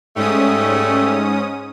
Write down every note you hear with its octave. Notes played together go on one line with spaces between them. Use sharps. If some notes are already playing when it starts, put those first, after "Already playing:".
G#2 G3 A3 C#4 D#6